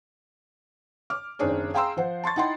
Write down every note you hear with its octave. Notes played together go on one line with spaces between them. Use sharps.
D6 F6
F#1 D#3 C4 D4 G#4 C#5
G#4 F5 G5 A#5 C6 E6
F3 C5 F#5
A5 C6 C#6 A6
D#4 E4 F#5 G5 C6